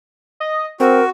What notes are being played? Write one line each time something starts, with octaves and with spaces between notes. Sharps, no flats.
D#5
C4 F#4 A#4